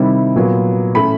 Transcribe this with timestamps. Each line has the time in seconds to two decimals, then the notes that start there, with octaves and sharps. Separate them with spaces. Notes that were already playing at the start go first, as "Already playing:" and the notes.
Already playing: C3 D#3 G3 C4 E4
0.35 A#2 F#3 B3
0.94 A2 E3 A3 C#4 E4 B5